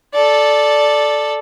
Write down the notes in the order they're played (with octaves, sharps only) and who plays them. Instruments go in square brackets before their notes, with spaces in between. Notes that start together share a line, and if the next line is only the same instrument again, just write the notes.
[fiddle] A4 D5